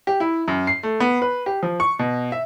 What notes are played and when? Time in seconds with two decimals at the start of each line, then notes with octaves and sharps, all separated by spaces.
0.07 G4
0.20 E4
0.48 F#2
0.67 C7
0.83 A3
1.00 B3
1.22 B4
1.46 G4
1.63 F3
1.80 C#6
1.99 B2
2.32 E5